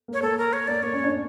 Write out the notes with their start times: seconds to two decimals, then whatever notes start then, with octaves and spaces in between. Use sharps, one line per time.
0.08 A#3
0.13 C#5
0.22 A#3 A4
0.38 A#4
0.53 C#5
0.67 A#3 D5
0.83 A#3 C#5
0.93 C#4
1.04 D4
1.13 C#4